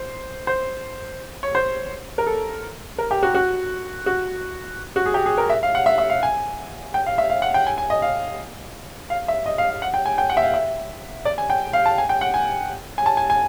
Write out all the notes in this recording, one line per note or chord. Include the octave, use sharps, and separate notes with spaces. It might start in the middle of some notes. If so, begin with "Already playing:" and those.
Already playing: C5
C5
C#5
C5
A#4
A4
A#4
G4
F#4
F#4
F#4
F#4
G#4
G4
G#4
A#4
E5
F5
F#5
E5
E5
F5
G#5
G5
F5
E5
F5
F#5
G5
G#5
G#5
D#5
F5
F5
E5
D#5
F5
F5
F#5
G5
G#5
G5
F#5
E5
F5
E5
D5
G#5
G5
F5
A5
G#5
G5
F#5
G#5
G#5
A5
G#5
G#5